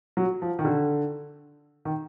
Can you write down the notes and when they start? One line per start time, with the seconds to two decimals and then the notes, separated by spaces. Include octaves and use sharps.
0.17 F#3
0.42 F3
0.59 D#3
0.65 D3
1.85 D#3